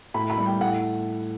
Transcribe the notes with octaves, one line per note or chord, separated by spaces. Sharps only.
A2 B5
B5
G3
G5
A2 F#5